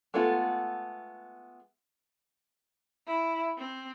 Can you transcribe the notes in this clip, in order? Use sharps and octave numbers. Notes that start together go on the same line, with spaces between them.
G#3 A3 B3 F4 A4
E4
C4